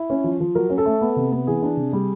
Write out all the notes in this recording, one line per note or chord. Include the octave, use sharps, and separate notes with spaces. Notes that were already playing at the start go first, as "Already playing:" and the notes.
Already playing: E4
C#4
F3
F3
F#3 A#4
C#4
A4
A3
B3
C3
B3
E3 G#4
D4
C3
G3